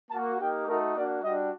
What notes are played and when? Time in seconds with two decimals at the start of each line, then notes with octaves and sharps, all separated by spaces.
0.11 A#3 F#4 A5
0.39 A#3 D#4 G4 G5
0.67 A3 D#4 F#4 A#4
0.95 A#3 D4 F#4 D5
1.23 G3 D4 F#4 D#5